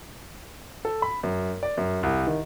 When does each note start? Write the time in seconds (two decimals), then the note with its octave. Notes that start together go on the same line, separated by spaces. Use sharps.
0.85 A4
1.02 B5
1.23 F#2
1.63 D5
1.77 F#2
2.03 C2
2.27 D#3